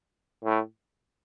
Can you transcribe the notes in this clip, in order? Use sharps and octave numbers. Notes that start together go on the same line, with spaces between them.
A2